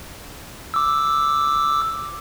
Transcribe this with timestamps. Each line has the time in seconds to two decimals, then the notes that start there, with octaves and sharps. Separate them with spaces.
0.74 D6 E6